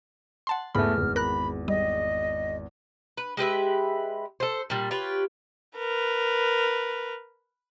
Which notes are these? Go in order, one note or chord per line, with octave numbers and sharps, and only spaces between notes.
F#5 A5 C6
E2 G#2 A3 B5 F6
G#1 E2
A#4 B5 F#6
G3 D#5
B4
G#3 G4 B4 E5
A4 C5
A#2 G3
F4 G4 B4 C#5
A#4 B4